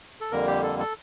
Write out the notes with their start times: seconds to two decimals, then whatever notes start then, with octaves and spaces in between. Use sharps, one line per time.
0.21 A4
0.32 F2 D3 G3 A#3 A#4
0.47 G4
0.63 A4
0.79 A4